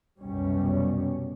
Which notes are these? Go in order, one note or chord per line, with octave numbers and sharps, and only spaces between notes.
C2 F#2 B2 G3 C#4